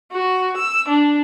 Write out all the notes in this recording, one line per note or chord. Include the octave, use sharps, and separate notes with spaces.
F#4
E6
D4